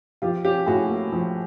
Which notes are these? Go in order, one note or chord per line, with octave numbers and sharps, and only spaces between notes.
F3 F4 G4
C#4 F4 G4
A2 F#4 G#4
A#3
F3